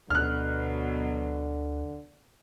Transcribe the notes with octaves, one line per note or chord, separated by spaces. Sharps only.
D2 B2 D3 F#3 F6 F#6